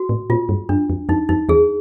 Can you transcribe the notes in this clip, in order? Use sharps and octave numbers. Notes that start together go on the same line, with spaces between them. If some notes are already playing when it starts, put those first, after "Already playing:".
Already playing: F#4
A2
A#2 F4
G2
F#2 D4
F2
F2 D#4
F2 D#4
E2 G#4